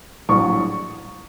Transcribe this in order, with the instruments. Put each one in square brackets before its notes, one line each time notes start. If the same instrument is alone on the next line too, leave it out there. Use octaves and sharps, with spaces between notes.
[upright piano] A#1 A2 F#3 C#6